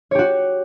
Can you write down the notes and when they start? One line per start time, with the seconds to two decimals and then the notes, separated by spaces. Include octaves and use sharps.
0.11 C#5
0.15 G4
0.19 F#4